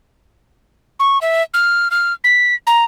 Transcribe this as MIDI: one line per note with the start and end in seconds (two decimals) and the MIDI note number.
0.99 1.18 85
1.21 1.42 76
1.54 1.88 89
1.91 2.13 89
2.24 2.55 95
2.67 2.84 82